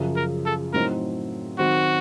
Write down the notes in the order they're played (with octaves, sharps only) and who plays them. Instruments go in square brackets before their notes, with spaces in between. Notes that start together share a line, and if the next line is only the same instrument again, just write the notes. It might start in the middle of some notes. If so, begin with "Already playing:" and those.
Already playing: [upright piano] F#2 C#3 F3
[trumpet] A#4
A4
[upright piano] A2 F#3 C4 D#4 [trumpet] A#4
[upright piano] D#3 F#3 C4 [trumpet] F#4